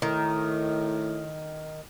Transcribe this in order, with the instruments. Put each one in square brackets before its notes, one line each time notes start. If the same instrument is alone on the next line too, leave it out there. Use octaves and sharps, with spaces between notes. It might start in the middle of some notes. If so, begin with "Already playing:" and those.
[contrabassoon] A2 [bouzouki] D#3